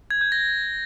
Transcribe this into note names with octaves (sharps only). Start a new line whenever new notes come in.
G#6
G6
A#6